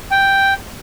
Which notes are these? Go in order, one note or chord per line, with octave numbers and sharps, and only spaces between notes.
G5